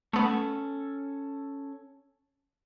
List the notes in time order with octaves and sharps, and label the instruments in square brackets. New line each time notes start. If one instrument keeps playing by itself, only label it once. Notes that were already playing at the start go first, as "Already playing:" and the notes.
[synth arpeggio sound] A3 B3 [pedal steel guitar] C#4 A4